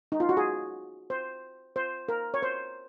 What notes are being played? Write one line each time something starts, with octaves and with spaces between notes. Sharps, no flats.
D#4
F4
F#4
G#4
C5
C5
A#4
C#5
C5